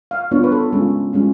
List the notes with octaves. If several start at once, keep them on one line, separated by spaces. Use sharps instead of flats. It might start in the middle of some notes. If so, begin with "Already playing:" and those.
F5
B3 D4 F4 C#5
B4
A4
G#3 C#4 F4
G#3 C#4 F4